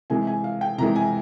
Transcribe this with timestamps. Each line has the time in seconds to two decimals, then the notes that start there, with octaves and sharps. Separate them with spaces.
0.10 C3 E3 G#3 G#5
0.27 G#5
0.44 F5
0.61 G5
0.78 C3 E3 G#3 A#5
0.96 G#5